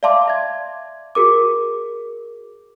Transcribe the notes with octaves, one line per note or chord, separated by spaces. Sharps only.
D5 E5 F5 A5 C6 D6
E5 G#6
F#4 G#4 A#4 D6